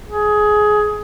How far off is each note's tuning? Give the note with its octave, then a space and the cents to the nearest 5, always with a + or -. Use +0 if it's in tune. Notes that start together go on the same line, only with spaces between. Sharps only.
G#4 +15